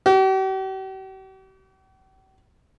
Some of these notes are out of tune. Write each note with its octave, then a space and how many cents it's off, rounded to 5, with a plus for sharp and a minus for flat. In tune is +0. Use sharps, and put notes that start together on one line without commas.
G4 -45